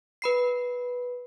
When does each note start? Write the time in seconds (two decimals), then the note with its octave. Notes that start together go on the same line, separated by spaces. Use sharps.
0.22 B4 B5 C7